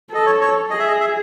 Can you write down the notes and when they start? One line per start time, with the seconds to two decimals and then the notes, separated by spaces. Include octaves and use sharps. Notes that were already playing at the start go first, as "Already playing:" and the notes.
0.11 A4 D#5
0.26 C#5
0.41 C#5
0.70 G#4 D#5
0.79 E5
0.88 D#5
1.01 E5